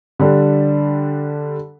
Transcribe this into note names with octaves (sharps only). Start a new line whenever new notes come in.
D3 G3 D4 A4